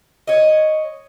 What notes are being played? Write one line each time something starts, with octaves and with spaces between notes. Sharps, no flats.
C#5 D#5